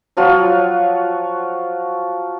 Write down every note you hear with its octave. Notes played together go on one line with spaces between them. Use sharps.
F3 F#3 F4 F#4